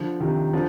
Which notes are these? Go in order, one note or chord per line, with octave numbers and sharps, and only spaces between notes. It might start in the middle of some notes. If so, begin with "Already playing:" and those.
Already playing: D3 F3
C3 D#3
D3 F3